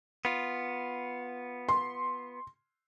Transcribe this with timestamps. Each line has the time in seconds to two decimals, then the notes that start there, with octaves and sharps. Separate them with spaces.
0.25 B3 F4
1.69 C6